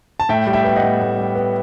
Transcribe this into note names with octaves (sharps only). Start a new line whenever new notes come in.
A5
A2 E5 G5
G3
E5 G5
B3 G5
D#5 F#5
A2
A2
G3
B3